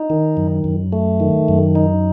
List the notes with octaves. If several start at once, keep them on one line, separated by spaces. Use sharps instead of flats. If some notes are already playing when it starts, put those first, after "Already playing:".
Already playing: D#4
D#3
F#2
F#2
A3
D#3
F#2
D#4